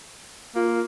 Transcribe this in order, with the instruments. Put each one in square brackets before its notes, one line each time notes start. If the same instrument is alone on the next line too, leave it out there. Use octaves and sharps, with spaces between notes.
[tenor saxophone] A#3 [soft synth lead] F4